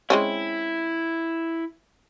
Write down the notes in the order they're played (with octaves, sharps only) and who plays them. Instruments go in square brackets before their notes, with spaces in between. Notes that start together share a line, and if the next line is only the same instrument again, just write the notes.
[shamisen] G#3 C4 C#4 [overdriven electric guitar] E4